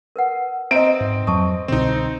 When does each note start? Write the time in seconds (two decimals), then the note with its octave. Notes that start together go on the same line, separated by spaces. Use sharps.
0.16 A#4 B4 F#5
0.71 C4 B4 D#5 E5 A#5 D7
1.00 G#2
1.27 F2 F#3 A5 C#6 D#6
1.68 C2 B2 D3 C4 D#4